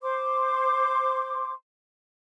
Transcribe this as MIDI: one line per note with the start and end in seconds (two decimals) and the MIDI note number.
0.02 1.52 72
0.02 1.52 84
0.02 1.52 86